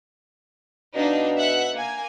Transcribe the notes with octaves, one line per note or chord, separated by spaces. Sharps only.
B2 D4 D#4 F5
E5 F#5 F#6
A#3 G#5